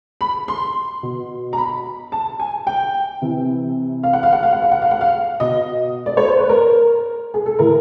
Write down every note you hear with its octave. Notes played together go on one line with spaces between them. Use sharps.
B5
C6
B2
A#5
B5
A5
G#5
G5
C3 E3
F5
F#5
F5
F#5
F5
F#5
F5
F#5
F5
F#5
F5
B2 D#5
D5
C#5
C5
B4
A#4
G#4
A4
A2 E3 A#4